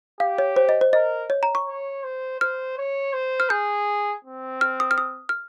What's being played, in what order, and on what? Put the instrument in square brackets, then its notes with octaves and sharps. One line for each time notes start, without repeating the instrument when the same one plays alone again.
[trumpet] G4 [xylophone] F5
[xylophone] C#5
C5
D#5
C5
[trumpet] A#4 [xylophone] D#5
[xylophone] C#5
A#5
C#6
[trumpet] C#5
C5
[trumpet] C5 [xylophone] F6
[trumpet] C#5
C5
[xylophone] F6
[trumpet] G#4 [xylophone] G6
[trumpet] C4
[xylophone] F6
D#6
F6
D#6
F6